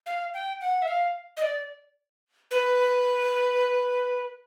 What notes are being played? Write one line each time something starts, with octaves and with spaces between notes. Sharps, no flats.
F5
G5
F#5
E5
F5
D#5
D5
B4